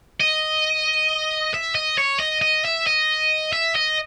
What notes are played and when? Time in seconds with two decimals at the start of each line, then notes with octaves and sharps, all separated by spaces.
0.20 D#5
1.54 E5
1.75 D#5
1.98 C#5
2.20 D#5
2.42 D#5
2.65 E5
2.87 D#5
3.53 E5
3.76 D#5